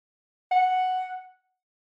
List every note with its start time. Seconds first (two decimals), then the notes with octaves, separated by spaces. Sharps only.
0.52 F#5